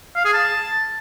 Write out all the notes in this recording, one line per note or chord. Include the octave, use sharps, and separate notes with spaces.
F5
G#4
A5